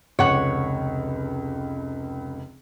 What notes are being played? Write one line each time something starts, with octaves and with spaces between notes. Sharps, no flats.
F1 C#2 C#5 F#5